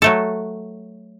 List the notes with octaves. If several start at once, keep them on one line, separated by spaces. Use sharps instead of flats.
F#3 A3 A4